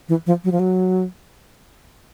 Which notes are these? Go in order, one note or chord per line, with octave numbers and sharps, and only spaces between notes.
E3
F3
F#3
F3
F#3